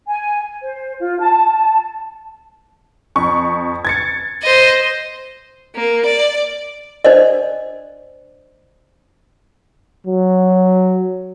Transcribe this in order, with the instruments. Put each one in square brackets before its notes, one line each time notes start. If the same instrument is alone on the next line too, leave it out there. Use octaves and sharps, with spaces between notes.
[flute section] G#5
C5
F4
A5
[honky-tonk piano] F2 C#6
G#6 A6 C#7
[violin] C5 D#5
[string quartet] A#3
D5
[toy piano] D4 C5 D5 D#5
[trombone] F#3